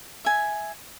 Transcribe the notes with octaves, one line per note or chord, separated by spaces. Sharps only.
E5 G#5